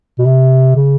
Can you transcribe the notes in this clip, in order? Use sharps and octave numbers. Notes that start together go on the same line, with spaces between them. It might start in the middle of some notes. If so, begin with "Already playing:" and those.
B2
C3
C#3